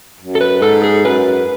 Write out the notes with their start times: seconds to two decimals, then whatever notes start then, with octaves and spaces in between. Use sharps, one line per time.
0.20 F#2
0.35 A4
0.41 B4
0.62 G#2 A4
0.84 G#4
1.05 F#2 B4